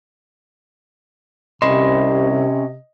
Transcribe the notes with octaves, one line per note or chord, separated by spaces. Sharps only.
C2 C3 C#4 D#5 B5 C6